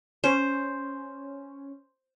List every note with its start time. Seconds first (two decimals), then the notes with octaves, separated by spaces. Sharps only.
0.24 C#4 C5